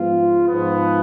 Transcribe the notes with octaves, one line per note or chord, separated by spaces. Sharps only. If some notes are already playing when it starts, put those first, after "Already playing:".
Already playing: G#2 F3 B3 F4
G#2 F3 B3